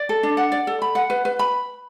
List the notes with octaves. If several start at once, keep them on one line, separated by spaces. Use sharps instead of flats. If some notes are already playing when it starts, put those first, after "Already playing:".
Already playing: D5
A4
D4
F#5
D5
A4
B5
F#5
B4
B4
B5